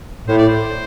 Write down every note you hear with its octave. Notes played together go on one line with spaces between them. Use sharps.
A2 C5
D5
C5